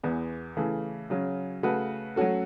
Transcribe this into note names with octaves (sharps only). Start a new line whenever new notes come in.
E2 E3 B3
C#3 E3 A3
C#3 F#3 C#4
C#3 A3 F#4 B4
F#3 A3 C#4 F#4 A4